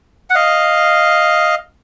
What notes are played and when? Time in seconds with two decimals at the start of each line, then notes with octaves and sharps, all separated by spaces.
0.30 F#5
0.35 D#5 F5